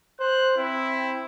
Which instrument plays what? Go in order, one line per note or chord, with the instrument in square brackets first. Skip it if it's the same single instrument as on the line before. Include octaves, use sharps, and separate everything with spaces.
[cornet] C5 [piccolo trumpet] F#6
[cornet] C4 [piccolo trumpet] E4